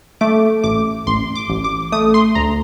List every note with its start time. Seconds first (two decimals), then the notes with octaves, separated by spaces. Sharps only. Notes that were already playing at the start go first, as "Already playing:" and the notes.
0.21 A3 D6
0.64 A1 D6
1.07 A1 C6
1.35 D6
1.50 A1
1.64 D6
1.92 A3 D#6
2.14 C6
2.35 D2 A#5